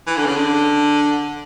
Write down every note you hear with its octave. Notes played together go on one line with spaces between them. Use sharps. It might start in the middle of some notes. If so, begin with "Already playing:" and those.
E3
D3
C#3
D3